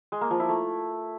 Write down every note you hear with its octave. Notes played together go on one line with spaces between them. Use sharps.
G#3
A#3
F3
E4
A3